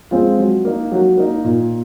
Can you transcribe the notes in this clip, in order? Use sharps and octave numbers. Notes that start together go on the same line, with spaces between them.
G#3 C4 F4
F#3
A#3 D#4
F#3
A#3 D#4
A#2